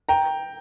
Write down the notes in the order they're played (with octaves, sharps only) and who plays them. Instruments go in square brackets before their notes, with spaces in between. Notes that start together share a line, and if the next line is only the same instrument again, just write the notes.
[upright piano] G5 A#5